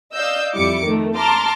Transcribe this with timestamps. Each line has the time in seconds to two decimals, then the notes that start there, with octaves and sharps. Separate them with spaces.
0.13 D5 D#5 F5 E6 G6
0.54 F2 G3 E4 D6 C#7
0.86 D#3 A3
1.17 A5 A#5 C6 D6 F6